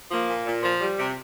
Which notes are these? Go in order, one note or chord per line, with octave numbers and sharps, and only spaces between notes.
F3 A#3
A#2
A#2
F3
G3
C3